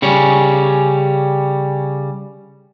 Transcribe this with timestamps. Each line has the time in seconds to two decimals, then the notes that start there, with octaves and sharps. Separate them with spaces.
0.02 C#3 G3 C#4